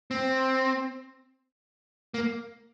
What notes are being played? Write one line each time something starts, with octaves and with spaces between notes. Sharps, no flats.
C4
A#3